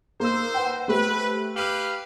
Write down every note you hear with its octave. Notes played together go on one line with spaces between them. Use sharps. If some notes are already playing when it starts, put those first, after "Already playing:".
A#3 D#4 C5 E6
B4 F#5 G5
A3 G4 B4 C5
G4 B4 F5 F6 D#7 F#7